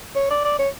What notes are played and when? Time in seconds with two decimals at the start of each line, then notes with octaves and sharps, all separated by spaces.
0.15 C#5
0.30 D5
0.45 D5
0.59 C#5